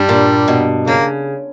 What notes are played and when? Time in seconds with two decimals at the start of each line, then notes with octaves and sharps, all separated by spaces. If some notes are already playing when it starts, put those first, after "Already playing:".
Already playing: G2 G3
0.09 A#2
0.48 B2
0.87 C#3 A#3